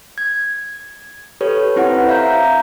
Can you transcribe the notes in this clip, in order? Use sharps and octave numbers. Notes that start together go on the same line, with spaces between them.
G#6
G4 A4 B4 C#5
C4 E4 B4 C5 F#5
E5 F5 A#5 G6